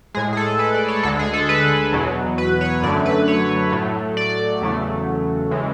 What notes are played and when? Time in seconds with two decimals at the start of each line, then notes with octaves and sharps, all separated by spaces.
0.14 A2 G#3 G#4
0.33 G#4
0.37 A4
0.59 B4
0.74 D5
0.88 C#5
1.03 D2 D3 G#3 A4
1.19 G#4
1.33 A4
1.49 B4
1.93 E2 B2 F#3
2.38 B4
2.61 C#5
2.83 F#2 D3 F#3 A3 D5
3.06 B4
3.28 C#5
3.72 A2 F#3 A3
4.17 D5
4.61 E2 C#3 F#3 A3
5.51 C#3 E3 G#3